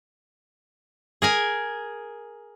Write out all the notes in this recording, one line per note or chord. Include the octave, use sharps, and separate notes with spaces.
G#4 A#4 G#5